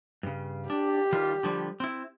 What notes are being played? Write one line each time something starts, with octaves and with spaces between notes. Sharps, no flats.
G2 C#3
D4 G4
D#3 G3 F4
D3 F3 G3
C4 E4